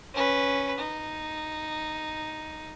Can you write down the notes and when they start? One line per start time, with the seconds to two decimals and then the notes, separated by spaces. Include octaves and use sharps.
0.14 C#4 B4
0.78 D#4